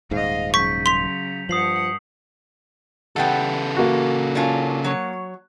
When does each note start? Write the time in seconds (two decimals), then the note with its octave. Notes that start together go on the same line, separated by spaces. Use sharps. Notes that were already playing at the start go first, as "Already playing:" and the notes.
0.11 D#1 G#2 D#5 F5
0.54 C#3 F#3 C#6 G6 B6
0.86 C6 B6 F7
1.49 G2 F3 F#5 D#6 C7 F#7
3.16 C#3 E3 G3 B3 A4 F#5 G5
3.76 A#3 F#4
4.35 C#4 D4 F4
4.84 F#3 C#5